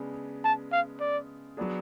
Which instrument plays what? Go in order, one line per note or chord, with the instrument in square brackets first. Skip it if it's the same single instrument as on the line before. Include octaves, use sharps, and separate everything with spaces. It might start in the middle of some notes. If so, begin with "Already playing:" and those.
Already playing: [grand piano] C#3 G#3 B3 D4
[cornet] A5
F5
D5
[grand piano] F#3 B3 D4 G#4